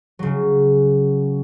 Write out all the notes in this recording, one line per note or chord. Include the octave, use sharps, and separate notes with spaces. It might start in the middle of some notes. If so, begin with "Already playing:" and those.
C#3 F#3